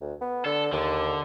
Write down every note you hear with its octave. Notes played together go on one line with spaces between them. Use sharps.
D2
B3
D3 A4
D#2 D3